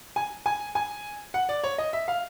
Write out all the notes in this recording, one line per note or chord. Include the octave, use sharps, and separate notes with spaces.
G#5
G#5
G#5
F#5
D5
C#5
D#5
E5
F5